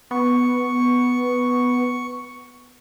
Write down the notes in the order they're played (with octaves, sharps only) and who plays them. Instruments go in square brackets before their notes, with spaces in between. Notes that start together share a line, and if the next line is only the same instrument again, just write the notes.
[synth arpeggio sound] B3 [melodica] C#6